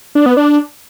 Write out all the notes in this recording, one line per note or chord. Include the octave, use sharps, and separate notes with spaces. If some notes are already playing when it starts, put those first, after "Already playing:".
D4
B3
D4